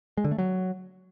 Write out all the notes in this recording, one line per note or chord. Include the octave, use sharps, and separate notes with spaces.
G#3
D3
A3
F#3